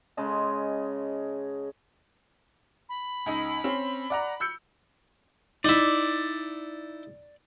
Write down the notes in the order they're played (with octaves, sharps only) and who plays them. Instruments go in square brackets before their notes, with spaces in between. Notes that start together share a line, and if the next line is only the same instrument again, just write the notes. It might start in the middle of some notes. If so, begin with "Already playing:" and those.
[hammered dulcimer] C#3 G#3 D#5 A5
[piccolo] B5
[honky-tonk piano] C#2 D#4
C4 C#4
D5 F#5 A#5
E6 G6 C#7
[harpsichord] D#4 E4 [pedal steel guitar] D5